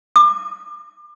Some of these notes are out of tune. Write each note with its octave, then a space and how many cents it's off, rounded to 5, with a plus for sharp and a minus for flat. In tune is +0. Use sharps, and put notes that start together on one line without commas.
D6 +30